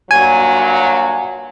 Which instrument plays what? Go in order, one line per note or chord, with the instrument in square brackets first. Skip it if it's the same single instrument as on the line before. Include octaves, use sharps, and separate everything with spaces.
[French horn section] G2 A#2 F#3 [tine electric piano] G#5